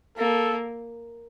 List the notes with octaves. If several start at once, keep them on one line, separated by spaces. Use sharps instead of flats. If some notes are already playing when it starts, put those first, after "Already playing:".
A#3 A4